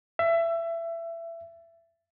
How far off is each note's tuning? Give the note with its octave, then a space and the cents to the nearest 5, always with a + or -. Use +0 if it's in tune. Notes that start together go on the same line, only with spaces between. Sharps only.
E5 +25